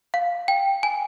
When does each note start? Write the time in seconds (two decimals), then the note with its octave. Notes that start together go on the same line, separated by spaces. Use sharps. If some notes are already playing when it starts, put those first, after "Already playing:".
0.14 F5
0.48 G5
0.83 G#5